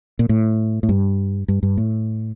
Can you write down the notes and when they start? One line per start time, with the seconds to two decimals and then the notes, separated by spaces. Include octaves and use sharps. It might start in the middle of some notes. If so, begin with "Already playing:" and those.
0.19 A#2
0.29 A2
0.83 A2
0.89 G2
1.48 G2
1.63 G2
1.77 A2